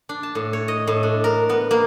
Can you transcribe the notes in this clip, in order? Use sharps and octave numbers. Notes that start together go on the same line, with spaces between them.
D4
A5
A2
C#5
D#5
A2
D4
A#4
B3
A#3